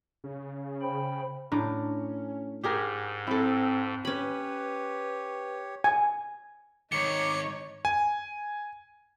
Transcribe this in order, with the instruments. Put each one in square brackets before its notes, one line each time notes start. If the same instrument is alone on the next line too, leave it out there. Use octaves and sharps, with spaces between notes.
[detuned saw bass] C#3
[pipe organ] C5 G5 B5
[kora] A2 [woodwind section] C#4 [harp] D4 A#5 D6
[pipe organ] G#2 [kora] G4 G#4 A#4
[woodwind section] C4 [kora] E4 A4
[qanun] C#4 B5 [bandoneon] G4 C#5 [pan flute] B4
[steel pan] G#5
[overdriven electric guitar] G#2 D#3 [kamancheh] D#4 C#5 [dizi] D6 [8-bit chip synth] C#7
[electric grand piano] G#5